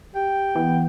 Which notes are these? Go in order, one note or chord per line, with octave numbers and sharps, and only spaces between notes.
G4 G5
E3 B3